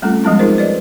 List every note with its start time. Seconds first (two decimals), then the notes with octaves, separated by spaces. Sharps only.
0.02 G3 A3 C4 C#4 F4 A4
0.24 F3 G3 G#3 B3 C4 E4
0.39 D#4 F4 G#4 A#4 C5
0.58 B4 C5 D5 D#5